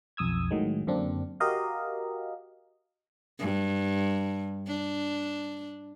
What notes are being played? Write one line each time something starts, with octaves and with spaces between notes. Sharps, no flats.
B1 F2 D#6 E6 G#6
A2 D#3 F#3 G#3
F#2 D3 A#3 C4 D4
F#4 G4 A#4 D#5 F5
G2
D4